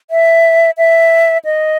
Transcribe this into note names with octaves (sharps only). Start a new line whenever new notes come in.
E5
E5
D#5